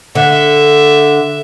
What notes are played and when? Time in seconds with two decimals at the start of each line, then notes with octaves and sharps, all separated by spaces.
0.15 D3 E5